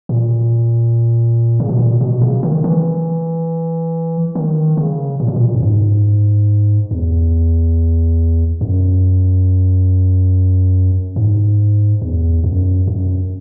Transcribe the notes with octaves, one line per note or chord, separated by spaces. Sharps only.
A#2
C#3
B2
A#2
B2
C#3
D#3
E3
D#3
C#3
A#2
B2
A#2
F#2
G#2
E2
F#2
G#2
E2
F#2
F#2